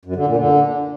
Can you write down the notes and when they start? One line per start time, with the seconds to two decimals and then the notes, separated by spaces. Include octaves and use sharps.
0.05 F#2
0.16 D3
0.26 A#2
0.37 D3